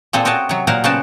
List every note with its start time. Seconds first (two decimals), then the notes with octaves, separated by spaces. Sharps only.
0.13 A#2 A#3 C4 G#4 A4
0.25 C4 F#4 C#5 D#5 G5 A5
0.49 C3 F#3
0.67 A#2 F#3 A#4 C5 F5 F#5
0.84 C#3 B3 F#4 C5 G5 A5